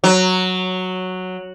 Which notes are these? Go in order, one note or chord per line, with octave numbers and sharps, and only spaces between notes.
F#3